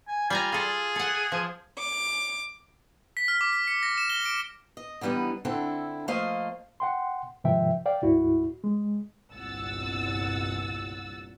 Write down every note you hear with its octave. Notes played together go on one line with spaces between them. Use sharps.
G#5
G3 F4 G#5 A#5
F4 G#4 A4
A4 F#5
F3
D6
B6
F6
D6
B6
C#7
A#6
E7
G7
D7
D#5
D3 E3 G3 B3 D#4
D3 C4 D4 E4 A4
F3 A3 A#3 C5 D#5 F5
F#5 G5 C6
G#2 C3 D#3 F3 E5 G5
D5 F5 G5
D2 G#2 E4 F#4
G#3
G1 C2 A#2 F#5 E6 A6